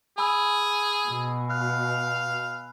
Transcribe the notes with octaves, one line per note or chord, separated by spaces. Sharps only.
G#4 G#5 B5 E6
B2
F5 F#6